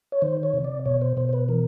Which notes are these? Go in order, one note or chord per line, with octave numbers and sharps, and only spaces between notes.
C#5
D#3 C5
C#5
C3
D5
B2 C#5
C5
B2 C5
C5
B4
E3 A#4